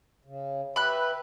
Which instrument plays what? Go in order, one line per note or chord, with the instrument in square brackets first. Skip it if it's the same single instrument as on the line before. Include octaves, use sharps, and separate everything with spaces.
[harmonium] C#3
[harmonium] G4 B4 E5 [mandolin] B5 F#6